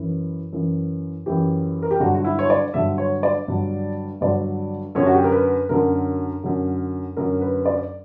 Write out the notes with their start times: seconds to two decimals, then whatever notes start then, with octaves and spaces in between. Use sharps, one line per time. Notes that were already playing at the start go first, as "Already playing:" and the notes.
Already playing: F#2 E3
0.53 F#2 E3
1.26 F#2 E3 G4
1.83 A#4
1.91 G4
2.00 G2 D3 F#3 F#4
2.15 F#4
2.24 E4
2.39 C#5
2.50 D5
2.74 G2 D3 F#3 E5
2.98 C#5
3.23 D5
3.48 G2 D3 F#3
4.21 G2 D3 F#3 D5
4.95 F#2 D3 F#3 C#5
5.06 F#4
5.14 G4
5.24 A#4
5.32 B4
5.69 F#2 D3 F#3 A#4
6.43 F#2 D3 F#3
7.17 F#2 D3 F#3 A#4
7.41 B4
7.66 D5